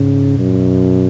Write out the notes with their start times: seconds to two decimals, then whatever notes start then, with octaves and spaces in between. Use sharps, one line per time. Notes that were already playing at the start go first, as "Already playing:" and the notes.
Already playing: G#2 C#3
0.38 F#2 B2
0.48 A#2
0.57 B2